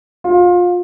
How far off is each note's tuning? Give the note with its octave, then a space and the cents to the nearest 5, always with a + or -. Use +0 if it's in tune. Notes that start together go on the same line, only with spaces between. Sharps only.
F4 +25